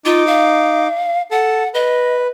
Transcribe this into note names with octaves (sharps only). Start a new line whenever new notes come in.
D#4 F4 D6
F5
A4 F#5 A5
B4 D#5